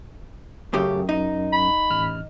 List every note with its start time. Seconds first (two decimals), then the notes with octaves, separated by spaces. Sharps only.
0.73 F#2 C#3 A3 G4
1.09 D#4
1.53 B5
1.90 A1 F6